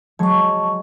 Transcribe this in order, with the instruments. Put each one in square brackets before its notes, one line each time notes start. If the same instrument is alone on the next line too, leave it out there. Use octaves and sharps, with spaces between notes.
[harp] F#3 G#3 C#5 [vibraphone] A5 C#6